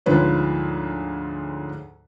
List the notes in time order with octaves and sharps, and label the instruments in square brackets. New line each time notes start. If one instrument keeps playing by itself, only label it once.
[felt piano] D2 G#2 F3 B4 C#5